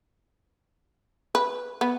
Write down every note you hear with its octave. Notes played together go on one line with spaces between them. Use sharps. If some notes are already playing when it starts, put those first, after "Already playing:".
B4
B3